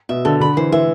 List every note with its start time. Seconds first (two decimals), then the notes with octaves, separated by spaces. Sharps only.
0.09 B2 E5
0.25 D3 A4
0.40 D3 B5
0.57 E3 C5
0.72 E3 E5